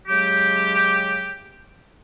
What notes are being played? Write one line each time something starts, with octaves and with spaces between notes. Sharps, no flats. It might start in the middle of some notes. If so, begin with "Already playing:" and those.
C#3 F#3 G#3 G4